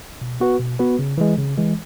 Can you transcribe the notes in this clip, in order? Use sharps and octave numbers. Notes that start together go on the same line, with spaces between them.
B2
B3 F#4 B4
B2
B3 F#4 B4
C#3
E3 G#3
C#3
E3 G#3